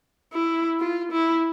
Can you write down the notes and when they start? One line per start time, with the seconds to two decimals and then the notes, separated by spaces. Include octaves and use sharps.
0.33 E4
0.80 F4
1.12 E4